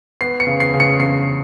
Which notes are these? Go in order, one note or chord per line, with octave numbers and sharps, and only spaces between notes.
B3 C7
C#7
C#3
C7
C#3
C#7
C#3 C7